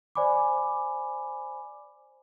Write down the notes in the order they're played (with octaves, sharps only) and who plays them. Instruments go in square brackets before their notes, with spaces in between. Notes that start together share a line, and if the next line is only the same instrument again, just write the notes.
[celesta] C5 D5 G#5 B5 D6